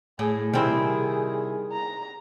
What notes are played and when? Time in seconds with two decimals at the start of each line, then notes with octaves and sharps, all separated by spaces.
0.19 A2 G#4
0.53 C3 D#3 G3 C4 E4 G#4
1.72 A#5